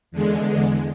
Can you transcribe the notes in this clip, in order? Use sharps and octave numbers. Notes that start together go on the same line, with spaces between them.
E2 D3 G#3